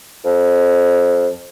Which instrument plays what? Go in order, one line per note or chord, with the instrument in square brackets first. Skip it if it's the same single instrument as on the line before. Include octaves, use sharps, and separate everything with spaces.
[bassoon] F2